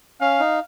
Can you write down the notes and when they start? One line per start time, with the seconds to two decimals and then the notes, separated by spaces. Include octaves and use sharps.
0.21 C#4 F5
0.39 D#4